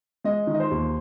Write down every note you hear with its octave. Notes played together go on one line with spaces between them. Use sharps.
G#3 D#5
D#3
D#5
C5
D#2